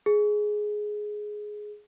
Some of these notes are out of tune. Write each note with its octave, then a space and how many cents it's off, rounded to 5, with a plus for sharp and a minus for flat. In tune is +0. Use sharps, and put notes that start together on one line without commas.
G#4 +10